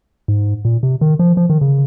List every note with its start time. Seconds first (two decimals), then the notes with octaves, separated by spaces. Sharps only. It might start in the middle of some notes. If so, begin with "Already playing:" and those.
0.28 G#2
0.65 A#2
0.83 C3
1.01 D#3
1.19 F3
1.37 F3
1.50 D#3
1.61 C#3